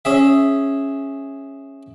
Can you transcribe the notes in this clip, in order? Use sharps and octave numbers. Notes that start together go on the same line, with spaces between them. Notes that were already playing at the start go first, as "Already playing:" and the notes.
C#4 G#4 E5